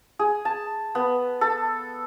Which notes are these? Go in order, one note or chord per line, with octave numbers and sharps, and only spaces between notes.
G#4
A5
B3
A4